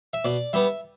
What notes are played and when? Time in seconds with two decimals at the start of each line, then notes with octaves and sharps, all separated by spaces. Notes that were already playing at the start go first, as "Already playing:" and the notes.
0.13 E5
0.24 B2 D5
0.53 G3 B3 E5